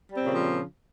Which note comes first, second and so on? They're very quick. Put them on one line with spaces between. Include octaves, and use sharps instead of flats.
G3 C4 A#2 C#3 F3